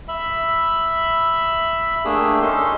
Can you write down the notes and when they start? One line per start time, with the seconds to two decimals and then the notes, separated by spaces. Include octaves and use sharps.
0.08 E5 B5
2.05 A3 A#3 D4 G4 G#4 E6
2.42 C#4 D#4 A4 C6